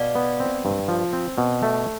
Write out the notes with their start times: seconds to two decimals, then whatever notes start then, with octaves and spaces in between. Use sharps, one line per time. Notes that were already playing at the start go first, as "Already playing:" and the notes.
Already playing: B2 D5 F5
0.15 B3
0.40 C4
0.65 G2
0.88 F3
1.13 C4
1.38 B2
1.63 A3